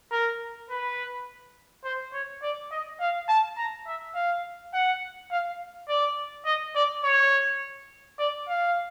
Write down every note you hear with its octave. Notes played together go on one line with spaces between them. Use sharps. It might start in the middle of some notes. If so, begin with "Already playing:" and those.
A#4
B4
C5
C#5
D5
D#5
F5
A5
A#5
E5
F5
F#5
F5
D5
D#5
D5
C#5
D5
F5